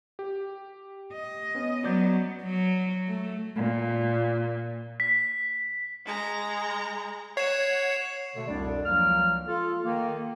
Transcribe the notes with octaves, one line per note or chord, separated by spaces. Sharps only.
G4
D#5
B3 C#4
F#3 B3 D5 G6
F#3
A3
A#2
B6
G#3 A#5
C#5 F#5 C7 E7
B2 D3 A3
C2 F2 B2 G3 D4 D5
C#2 F3 F#3 A#3 F6
F4 A4
D#3 A#3